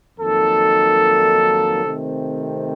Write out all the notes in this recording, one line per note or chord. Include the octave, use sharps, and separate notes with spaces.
F2 D#3 F#3 A#3 D#4 A4
C3 D#3 A3 C4